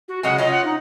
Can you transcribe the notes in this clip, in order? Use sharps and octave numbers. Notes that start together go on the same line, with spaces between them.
F#4
C#3 F#3 G#3 F#5
C#4 D#4 F4 D#5
F#5
D#4